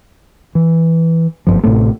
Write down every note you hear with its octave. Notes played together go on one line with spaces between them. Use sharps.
E3
F#1 C2 G2 F3
A1 A2 C3 A3